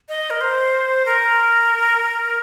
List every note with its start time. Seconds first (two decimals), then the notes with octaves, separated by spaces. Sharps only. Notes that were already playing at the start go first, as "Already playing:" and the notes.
0.09 D#5
0.30 A#4
0.41 C5
1.06 A#4